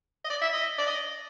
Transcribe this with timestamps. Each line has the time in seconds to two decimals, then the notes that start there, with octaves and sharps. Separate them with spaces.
0.24 D#5
0.30 D5
0.42 E5
0.53 D#5
0.78 D5
0.87 D#5